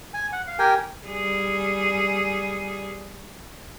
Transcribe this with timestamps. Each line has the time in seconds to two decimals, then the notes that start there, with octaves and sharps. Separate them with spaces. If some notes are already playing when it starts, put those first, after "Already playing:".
0.14 G#5
0.32 F#5
0.47 F5
0.59 G4 A#4 G5 G#5
1.06 G3 G#4